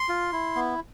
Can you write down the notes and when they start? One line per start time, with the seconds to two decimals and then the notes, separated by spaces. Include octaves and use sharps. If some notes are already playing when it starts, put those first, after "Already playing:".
Already playing: C6
0.09 F4
0.32 E4
0.56 B3